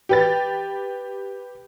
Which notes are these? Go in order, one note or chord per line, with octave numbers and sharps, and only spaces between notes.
G4 B4 A6